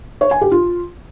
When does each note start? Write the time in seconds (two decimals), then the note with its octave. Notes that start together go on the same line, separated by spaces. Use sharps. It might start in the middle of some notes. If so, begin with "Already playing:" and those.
0.21 C#5
0.31 G#5
0.41 G4
0.51 F4